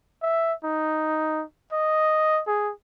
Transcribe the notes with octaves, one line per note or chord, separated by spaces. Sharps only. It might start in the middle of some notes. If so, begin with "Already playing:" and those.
E5
D#4
D#5
G#4